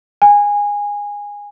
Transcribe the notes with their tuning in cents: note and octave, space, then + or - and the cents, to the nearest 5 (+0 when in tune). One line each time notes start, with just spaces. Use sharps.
G#5 -15